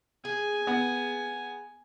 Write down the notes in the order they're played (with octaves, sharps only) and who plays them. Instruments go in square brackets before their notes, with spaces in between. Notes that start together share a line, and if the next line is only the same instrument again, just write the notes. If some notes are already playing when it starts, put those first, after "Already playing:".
[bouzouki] G#4 [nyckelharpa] G#5
[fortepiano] B3